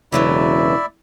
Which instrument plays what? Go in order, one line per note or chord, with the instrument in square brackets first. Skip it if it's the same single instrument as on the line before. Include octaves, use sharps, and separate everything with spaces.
[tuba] E1 [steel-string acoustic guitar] C#3 E3 F#3 [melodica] E4 D5 E5